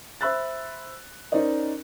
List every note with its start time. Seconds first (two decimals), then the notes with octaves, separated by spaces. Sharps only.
0.21 C5 E5 B5 E6 F#6 A6
1.32 C#4 D#4 A#4 C5 D5 D#5